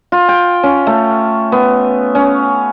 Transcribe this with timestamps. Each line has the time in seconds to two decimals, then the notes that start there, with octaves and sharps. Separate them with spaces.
0.12 F4
0.28 G5
0.63 C#4
0.87 A3
1.52 B3
2.15 C#4